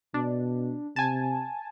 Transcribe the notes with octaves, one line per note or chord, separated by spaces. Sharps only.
B2 D4
C3 G#5 A5